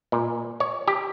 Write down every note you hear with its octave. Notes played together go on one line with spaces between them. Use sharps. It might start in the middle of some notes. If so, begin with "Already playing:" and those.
A#2
C#5
G4